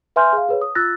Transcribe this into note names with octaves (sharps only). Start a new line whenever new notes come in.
B4 E5 G#5 C6 F6 G6
G#4 F5
G#4 B4 C#5
D#6
F4 E6 F#6 A6 A#6